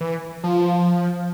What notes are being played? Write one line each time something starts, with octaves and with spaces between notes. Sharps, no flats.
E3
F3